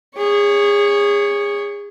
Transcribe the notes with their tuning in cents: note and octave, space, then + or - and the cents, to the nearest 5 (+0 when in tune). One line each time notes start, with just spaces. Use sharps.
G#4 -30 C#5 +10